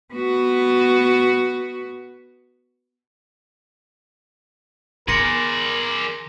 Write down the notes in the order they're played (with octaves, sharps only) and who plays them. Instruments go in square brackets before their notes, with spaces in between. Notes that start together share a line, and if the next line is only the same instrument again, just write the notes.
[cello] B3 F#4
[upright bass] D#3 [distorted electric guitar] G#4 D5 [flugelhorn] A#4 [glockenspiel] C6 A#6 C#7